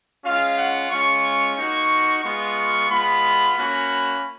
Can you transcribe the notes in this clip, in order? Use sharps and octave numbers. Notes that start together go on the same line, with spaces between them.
G#3 C#4 F4 F5
F#5
G#3 C#4 F4 C#6
A#3 D#4 F#4
G#3 B3 F4 C#6
G#3 B3 F4 B5
A#3 C#4 F#4